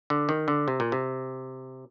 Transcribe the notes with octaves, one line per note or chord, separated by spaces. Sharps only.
D3
D#3
D3
C3
A#2
C3